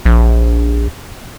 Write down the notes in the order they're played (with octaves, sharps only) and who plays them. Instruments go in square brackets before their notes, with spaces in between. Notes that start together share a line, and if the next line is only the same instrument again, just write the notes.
[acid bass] A#1